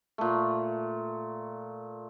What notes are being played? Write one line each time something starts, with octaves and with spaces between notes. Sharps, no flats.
A#2 A3